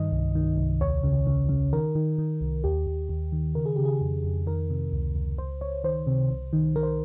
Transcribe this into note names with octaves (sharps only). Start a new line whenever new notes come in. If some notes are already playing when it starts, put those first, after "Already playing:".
Already playing: G2 D#3 D#5
C2
D#3
C2
D#2 C#5
C#3
C#3
C#3
D#3 A#4
D#3
D#3
C2
D#2 G4
D#2
D#2
D#3
C#3 A#4
G#4
C#3 G4
G#4
F2
F2
D#3 A#4
C3
C#2
C#2
C#2 C5
C#2 C#5
D#3 C5
C3
C2
D#3
D#3 A#4
C5